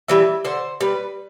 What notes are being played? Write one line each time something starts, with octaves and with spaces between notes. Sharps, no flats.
E3 G3 E5
D3 C5
G3 B4